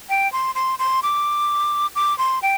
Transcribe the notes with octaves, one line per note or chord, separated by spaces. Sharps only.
G5
C6
C6
C6
D6
D6
C6
G5